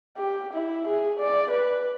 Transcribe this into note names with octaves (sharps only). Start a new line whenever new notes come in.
G4
E4
G#4
D5
B4